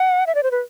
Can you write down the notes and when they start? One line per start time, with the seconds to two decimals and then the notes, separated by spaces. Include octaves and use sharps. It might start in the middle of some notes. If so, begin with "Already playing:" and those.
Already playing: F#5
0.27 E5
0.35 D5
0.43 C5
0.51 B4